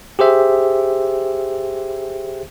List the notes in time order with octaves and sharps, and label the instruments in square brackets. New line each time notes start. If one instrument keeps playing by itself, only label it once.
[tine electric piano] G4 G#4 C5 E5